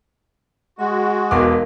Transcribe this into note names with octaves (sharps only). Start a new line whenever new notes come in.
G#3 F#4 C6
E1 B2 D#4 A#4 F5 D6